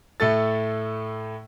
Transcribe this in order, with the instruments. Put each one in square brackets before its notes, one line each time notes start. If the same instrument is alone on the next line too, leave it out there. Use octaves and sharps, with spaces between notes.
[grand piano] A2 A3 A4 A6